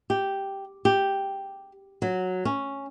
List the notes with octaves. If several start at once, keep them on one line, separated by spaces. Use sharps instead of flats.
G4
G4
F#3
C#4